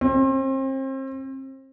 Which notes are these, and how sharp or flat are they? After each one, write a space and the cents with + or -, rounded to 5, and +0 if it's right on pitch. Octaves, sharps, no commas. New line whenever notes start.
C4 +35